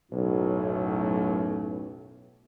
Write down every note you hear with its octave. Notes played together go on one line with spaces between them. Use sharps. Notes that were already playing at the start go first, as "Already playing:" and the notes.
B1 F#2 A2